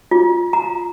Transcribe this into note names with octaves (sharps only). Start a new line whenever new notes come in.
F4
A#5